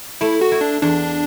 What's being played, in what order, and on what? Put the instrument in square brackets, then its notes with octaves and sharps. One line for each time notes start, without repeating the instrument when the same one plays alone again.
[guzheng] A3 [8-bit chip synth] E4
[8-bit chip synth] F#4
[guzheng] E4
[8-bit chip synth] D4
[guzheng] E2 [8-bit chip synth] D4